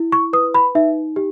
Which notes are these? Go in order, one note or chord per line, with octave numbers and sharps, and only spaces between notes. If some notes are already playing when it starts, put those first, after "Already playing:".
Already playing: E4
C#6
B4 D#6
B5
D#4 E5
G4